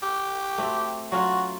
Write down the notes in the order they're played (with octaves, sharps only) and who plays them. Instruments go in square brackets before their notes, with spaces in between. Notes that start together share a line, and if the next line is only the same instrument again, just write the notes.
[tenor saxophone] G4
[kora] A3 C4 F#4
[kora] F#3 C#4 F4 [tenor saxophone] F#4